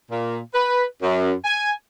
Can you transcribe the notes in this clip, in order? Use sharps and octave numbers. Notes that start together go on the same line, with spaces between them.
A#2
B4
F#2
G#5